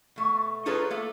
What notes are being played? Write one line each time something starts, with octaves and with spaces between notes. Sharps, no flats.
B2 A3
D#4 F4 G#4 A4 B4 C#5
A3 A#3 A4